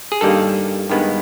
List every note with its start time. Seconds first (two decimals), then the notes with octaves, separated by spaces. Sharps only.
0.12 G#4
0.21 G2 D#3 G3 A#3 A4
0.90 G2 D#3 G#3 B3